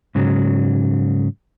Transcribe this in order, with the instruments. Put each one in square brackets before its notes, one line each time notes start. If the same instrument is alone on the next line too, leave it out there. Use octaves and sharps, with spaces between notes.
[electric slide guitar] G#2 C#3 F#3